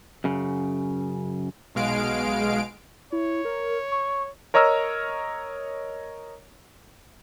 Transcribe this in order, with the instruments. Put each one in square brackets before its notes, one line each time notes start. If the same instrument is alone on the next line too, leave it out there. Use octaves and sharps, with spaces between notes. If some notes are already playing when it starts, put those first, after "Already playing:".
[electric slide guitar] F#2 C#3
[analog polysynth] B1 B2 G#3 F5 D7
[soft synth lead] E4 [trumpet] C#5
[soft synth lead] A#4
C#6
[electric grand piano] A#4 C#5 D#5 A#5 E6 F6